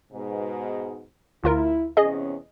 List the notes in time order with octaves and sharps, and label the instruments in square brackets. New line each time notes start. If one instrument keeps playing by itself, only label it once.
[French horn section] G#2 B2
[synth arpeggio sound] D2 F4 A#4 [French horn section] E4
[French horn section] E2 C3 C#4 [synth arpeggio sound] G#4 D#5